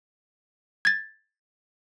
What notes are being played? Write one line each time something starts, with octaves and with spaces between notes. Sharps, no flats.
G#6 A6